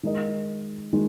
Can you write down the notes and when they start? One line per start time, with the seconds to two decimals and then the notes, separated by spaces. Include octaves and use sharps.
0.03 D#3 G#3 D#4 A#4 D#5
0.93 D#3 G#3